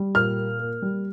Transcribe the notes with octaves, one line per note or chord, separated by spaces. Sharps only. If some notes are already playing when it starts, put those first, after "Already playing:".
Already playing: G3
A#2 F6
A#3
A#3
G3